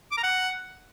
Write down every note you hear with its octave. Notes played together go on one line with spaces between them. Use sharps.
D6
A#5
F#5